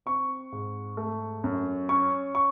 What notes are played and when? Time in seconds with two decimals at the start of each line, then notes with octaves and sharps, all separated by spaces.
0.06 C4 C#6
0.52 G#2
0.97 A3
1.44 F#2
1.89 C#4 C#6
2.35 C#6